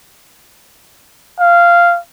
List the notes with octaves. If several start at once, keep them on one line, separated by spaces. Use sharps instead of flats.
F5